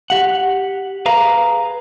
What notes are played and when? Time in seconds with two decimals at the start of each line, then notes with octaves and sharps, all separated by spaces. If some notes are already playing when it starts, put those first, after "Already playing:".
0.10 G4 F#5
1.06 G#4 B4 F5 A#5